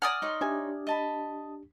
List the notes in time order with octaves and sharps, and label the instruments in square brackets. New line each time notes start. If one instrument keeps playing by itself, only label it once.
[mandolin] D5 D#6 F6 [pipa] F#5 G#5 A#5
[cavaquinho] D#4 C#5 C6
[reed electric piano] D4 G4 [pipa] E5 G#5
[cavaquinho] D#5 A5 B5